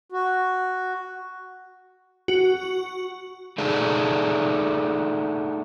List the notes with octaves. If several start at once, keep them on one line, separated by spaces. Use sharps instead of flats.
F#4
F#4
A3 D4 D#4 G#4